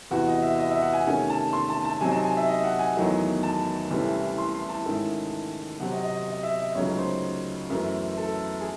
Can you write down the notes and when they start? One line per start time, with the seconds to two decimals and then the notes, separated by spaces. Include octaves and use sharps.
0.11 E2 C3 E3 F#4
0.27 D#5
0.42 E5
0.59 D#5
0.70 E5
0.82 F#5
0.93 G#5
1.05 C3 D#3 A3 C#4 G#5
1.30 A5
1.53 C6
1.70 A5
1.85 A5
2.01 C3 F#3 C4 D#4 G#5
2.12 A5
2.24 G#5
2.37 E5
2.48 D#5
2.64 F#5
2.79 G#5
2.95 E2 D#3 F#3 A3 D#4
3.43 A5
3.90 C2 C3 E3 A3 C#4
4.38 C6
4.53 C6
4.69 A5
4.85 G#2 D#3 A3 C#4 E4
5.80 C3 F#3 C4 F#5
5.92 D#5
6.04 D#5
6.27 D#5
6.43 E5
6.60 D#5
6.75 C#2 C#3 F#3 A3 D#4 C#5
6.98 C5
7.70 F#2 E3 A3
8.18 A4
8.61 G#4